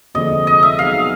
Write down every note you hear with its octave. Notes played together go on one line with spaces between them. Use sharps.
F1 D#2 D3 F3 G#3 D#5
D#5
E5
B2 F#3 B3 D#4 G#4 F5